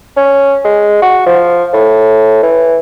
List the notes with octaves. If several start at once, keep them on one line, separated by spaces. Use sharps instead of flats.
C#4
G#3
F#4
F3
A2
E3